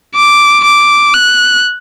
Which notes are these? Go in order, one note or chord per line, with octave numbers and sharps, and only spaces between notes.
D6
D6
F#6